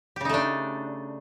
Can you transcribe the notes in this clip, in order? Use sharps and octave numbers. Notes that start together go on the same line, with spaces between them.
C#3 A3 D4 D#4 G4